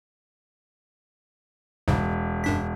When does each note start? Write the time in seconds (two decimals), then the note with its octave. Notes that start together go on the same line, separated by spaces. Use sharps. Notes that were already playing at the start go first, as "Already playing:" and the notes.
1.88 E1 C2 G#2 C#3
2.44 F#2 D4 B6